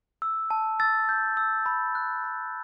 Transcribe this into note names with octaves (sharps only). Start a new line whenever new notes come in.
E6
A5
E6 A6
G6
E6
B5
F#6
B5